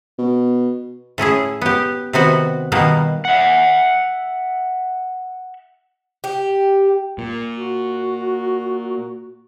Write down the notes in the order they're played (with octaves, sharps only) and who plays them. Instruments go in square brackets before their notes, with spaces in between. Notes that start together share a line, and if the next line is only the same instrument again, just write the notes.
[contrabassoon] B2
[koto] A2 C#4 E4 G#4
B3 G4
C3 D#3 B3 F#4
B2 D#3 G3 A#3 B3
[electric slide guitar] E5 F#5
[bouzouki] G4
[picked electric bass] A#2
[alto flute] F#4